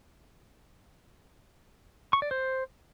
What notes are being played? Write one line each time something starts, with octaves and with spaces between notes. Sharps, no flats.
C#6
D5
C5